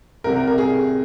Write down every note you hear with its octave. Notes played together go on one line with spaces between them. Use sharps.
C2 C3 G3 A#4
A#4
A#4
G#4